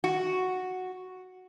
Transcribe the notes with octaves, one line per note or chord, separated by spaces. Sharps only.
F#4